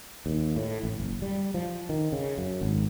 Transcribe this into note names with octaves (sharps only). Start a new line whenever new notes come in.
D#2
A2
A1
F#1
G3
F3
D#3
C#3
F#2
G#1